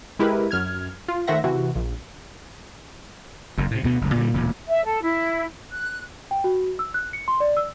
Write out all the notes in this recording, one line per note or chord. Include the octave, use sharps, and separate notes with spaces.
G#3 E4 G4 A#4 B4
F#2 F6 G#6
F4
D#3 A3 C5 E5 F#5 A#6
C3 E3 F#4
A#1
F#1 F#2
A2 C3
D2 B2 B3
F#1 C#2
A#2 D3 F#3 G3
E1 D2 A#2
E5
A4
E4
F#6
G5
F#4
E6
F#6
C#7
C6
D5
E6